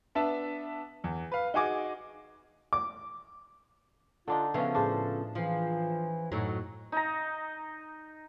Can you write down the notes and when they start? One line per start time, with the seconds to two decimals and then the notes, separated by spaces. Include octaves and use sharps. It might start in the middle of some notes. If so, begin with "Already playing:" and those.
0.15 B3 D4 E5 A5
1.04 E2
1.32 B4 F5
1.54 D#4 F#4 G#4 G#5 D6
2.73 D6
4.28 D3 D4 D#4 F4
4.54 C#3 F3 B3 C#4 E4 A4
4.75 A2 D4 G#4 C5 A5
5.35 E3 F3
6.32 F#2 A2 F#3 D#4
6.92 D#4 A#5